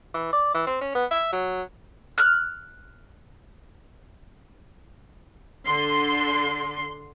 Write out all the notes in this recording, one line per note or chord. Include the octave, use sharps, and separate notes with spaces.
E3
D5
E3
C4
C#4
B3
E5
F#3
F6 F#6
D3 C6